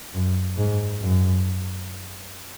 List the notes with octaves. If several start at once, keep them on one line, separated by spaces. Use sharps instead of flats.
F#2
G#2
F#2